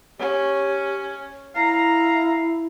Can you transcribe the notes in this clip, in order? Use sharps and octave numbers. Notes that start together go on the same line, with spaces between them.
C#4 G4
E4 F5 A#5